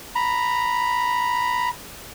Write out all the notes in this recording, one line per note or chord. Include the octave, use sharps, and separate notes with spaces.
A#5 B5